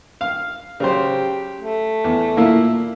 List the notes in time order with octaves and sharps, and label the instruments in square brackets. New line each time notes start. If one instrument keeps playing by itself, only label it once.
[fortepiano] F5
[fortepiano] C#3 F#3 C5 [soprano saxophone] G4
[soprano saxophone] A3
[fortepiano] E2
A#2 A#3 E4